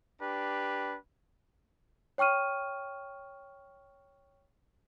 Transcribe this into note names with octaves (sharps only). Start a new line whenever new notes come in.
D4 G4 B4
C#5 G5 C#6 F6 D#7